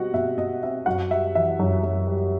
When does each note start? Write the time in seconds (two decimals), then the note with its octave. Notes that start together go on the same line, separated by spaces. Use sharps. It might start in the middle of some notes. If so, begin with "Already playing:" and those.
Already playing: B2 G3 C4 F#4 D#5 F#5
0.14 B2 E5
0.38 B2 D#5
0.62 C4 E5
0.86 F#2 F#4 F#5
1.11 G3 E5
1.35 E3 E5
1.59 F#2
1.83 F#2
2.07 G3